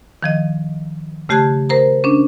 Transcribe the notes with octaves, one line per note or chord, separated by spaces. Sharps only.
D#3 F3 D#5
C#3 A3 G4 A5 F#6 G#6
A#4 C5 A#5
C#4 D4